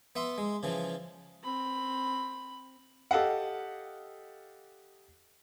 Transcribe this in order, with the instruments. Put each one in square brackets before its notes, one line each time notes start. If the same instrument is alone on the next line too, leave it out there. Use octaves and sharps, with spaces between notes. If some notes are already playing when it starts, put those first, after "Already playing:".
[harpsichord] B3 E5 C6
G#3
C#3 E3 F3
[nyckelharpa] C4 B5
[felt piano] G4 A4 D#5 F5 F#5